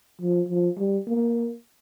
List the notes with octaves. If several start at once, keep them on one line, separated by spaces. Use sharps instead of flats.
F3
F3
G3
A#3